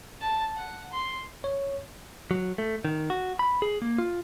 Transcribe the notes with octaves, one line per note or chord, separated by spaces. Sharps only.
A5
F#5
C6
C#5
F#3
A3
D#3
F#4
B5
G#4
A#3
F4